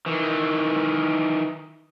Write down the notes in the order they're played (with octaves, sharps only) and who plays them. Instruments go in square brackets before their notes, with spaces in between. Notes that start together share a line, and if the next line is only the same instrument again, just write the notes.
[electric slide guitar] D#3 E3